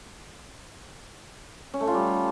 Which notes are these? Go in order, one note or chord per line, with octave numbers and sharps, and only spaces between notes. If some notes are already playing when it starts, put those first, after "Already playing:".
C#4
A3
F4
G3